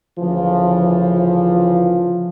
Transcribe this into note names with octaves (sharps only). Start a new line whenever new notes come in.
D2 C#3 E3 F3